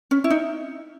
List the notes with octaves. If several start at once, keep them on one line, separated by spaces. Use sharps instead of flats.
C#4
E4
D#4